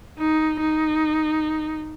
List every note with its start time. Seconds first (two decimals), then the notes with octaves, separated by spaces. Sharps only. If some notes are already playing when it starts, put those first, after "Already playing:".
0.18 D#4
0.60 D#4